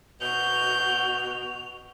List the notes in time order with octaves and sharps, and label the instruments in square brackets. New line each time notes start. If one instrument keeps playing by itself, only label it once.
[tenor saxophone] B2 [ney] F#4 [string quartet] G6 [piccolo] F7